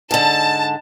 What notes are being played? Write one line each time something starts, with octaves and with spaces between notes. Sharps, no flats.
G#2 D3 A5